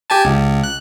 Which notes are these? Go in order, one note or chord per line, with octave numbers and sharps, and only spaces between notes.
G4 G#5 A5
C#2
F#6